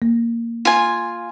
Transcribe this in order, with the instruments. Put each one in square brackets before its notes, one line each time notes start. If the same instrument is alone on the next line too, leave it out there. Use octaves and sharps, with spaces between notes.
[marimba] A#3
[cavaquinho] F4 G#5